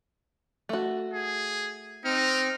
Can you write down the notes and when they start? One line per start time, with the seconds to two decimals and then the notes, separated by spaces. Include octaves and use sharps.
0.69 A3 F#4
1.13 G#4
2.05 C4 D#4 F6